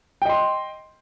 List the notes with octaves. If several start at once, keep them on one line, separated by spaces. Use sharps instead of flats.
D#5 G5 C6